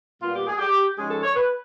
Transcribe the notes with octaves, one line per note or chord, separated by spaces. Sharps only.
A#2 G3 B3 F4
G4
G#4
G4
G#2 F3 G#3 C#4 G#4
A4
C#5
B4